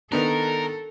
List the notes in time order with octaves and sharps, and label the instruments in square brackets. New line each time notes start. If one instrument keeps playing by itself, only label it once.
[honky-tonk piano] D#3 B3 D4 [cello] A4 [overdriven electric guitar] A#4